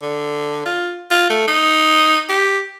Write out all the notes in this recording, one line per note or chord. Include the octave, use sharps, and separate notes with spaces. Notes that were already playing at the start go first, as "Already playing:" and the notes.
D3
F4
F4
A3
D#4
G4